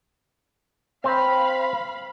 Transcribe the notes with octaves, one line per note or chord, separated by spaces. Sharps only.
C4 C5 F5 B5